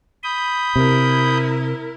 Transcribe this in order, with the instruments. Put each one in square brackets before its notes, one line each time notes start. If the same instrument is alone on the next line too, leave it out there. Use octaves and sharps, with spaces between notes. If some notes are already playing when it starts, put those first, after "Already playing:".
[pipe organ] B5 D#6 G6
[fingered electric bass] C3 [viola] E4 A#4